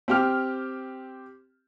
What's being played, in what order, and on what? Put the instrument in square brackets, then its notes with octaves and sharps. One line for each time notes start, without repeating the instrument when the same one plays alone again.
[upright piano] C4 G4 F6